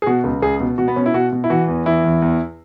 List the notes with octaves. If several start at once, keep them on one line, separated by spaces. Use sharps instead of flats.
G#4
B2 F#4
C#2
C#2 G#4
B2
B2 F#4
B3
B2 C#4
E4
B2 F#4
B2
E4
E3 F#4
E2
E3 E4
E2
E2